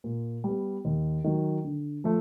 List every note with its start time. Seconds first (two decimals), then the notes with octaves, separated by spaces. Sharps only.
0.04 A#2
0.44 G3 B3
0.85 D#2
1.24 D#3 F#3
1.64 D3
2.04 F3 A3